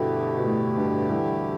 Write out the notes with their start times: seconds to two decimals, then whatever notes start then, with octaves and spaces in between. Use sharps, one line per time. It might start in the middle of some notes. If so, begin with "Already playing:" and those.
Already playing: D2 G2 B2 D3 A3 E4 G4
0.37 B2
0.45 A2
0.77 G2 B2
1.10 E3 G3